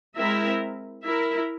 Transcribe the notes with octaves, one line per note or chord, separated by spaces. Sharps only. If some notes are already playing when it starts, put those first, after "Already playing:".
G#3 C4 E4 A#4 E5
E4 A#4 E5